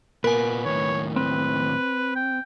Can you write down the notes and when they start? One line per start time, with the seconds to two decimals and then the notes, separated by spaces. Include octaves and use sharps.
0.24 A#2 B3 A#4 B4 G#5
0.65 D#2 A2 C#5
1.16 C4 B4
2.16 G5